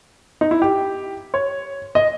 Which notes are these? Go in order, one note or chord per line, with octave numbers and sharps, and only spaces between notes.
D#4
E4
G4
C#5
D#5